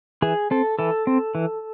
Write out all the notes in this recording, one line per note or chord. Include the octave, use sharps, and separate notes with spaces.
E3 G#4
C4 A4
E3 A4
C4
E3